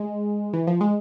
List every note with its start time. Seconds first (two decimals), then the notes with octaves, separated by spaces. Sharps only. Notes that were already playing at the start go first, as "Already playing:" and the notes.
Already playing: G#3
0.53 E3
0.67 F3
0.81 G#3